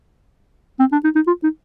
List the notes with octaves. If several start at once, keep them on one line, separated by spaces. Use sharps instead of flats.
C4
D4
D#4
D#4
F4
D#4